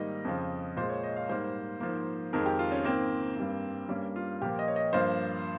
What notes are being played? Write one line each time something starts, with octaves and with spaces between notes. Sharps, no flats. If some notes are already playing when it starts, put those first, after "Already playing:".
Already playing: G#2 D#3 G3 A#3 D#5
F2 C#3 F3
A#2 G#3 C5
C#5
D#5
F5
G#2 G3 A#3 C5
G#2 F3 A#3
F2 D#3 G#3 A#4
G4
F4
C#4
G#2 D#3 A#3 C4
G2 G3 A#3
G2 G3 A#3 C#4
F4
A#2 F3 A#3 G4
D#5
C#5
D#5
G2 F3 A#3 C5